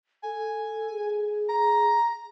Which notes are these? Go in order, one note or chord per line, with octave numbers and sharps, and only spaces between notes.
A4 G#5
G#4
A#5